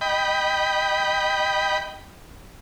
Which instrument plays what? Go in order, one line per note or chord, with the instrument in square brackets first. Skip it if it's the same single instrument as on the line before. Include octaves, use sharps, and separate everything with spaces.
[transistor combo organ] D#5 G5 B5